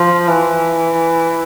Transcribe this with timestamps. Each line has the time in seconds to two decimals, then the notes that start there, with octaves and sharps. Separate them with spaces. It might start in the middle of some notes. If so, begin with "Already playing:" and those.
Already playing: F3
0.28 E3